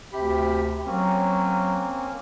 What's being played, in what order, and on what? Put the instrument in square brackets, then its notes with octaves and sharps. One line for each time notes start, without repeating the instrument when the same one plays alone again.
[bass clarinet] D2 [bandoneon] C3 G4 B5
[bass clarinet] F#3 [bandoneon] A#3 C4 C#4